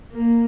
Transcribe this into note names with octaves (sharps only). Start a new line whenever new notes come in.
A#3